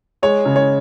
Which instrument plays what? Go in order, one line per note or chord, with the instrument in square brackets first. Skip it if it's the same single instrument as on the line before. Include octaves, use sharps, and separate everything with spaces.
[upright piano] G#3 [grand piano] C#5
[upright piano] C#3
[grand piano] C#5